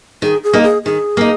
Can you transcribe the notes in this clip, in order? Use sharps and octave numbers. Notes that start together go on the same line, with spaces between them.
D#3 G#4
G#4
A#3 D#4
G#4
D#3 G#4
A#3 D#4